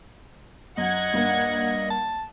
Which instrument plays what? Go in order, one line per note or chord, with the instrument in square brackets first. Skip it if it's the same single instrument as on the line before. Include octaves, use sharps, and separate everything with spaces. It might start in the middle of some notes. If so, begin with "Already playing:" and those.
[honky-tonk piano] F#2 [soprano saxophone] D#5 [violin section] F#5 G#6
[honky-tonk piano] G2 A#3
[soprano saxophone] A5